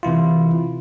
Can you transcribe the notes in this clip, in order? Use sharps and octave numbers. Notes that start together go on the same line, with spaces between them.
C3 E3 E4 F4